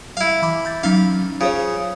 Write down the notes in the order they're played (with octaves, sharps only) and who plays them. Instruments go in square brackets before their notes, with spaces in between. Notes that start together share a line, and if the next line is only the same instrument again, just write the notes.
[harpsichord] E4 F5
[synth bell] E3 B5 D6
B5 G6 A6
[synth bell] F#3 C#4 D#4 [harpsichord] F5
[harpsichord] C#3 [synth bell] F4 C5 C#5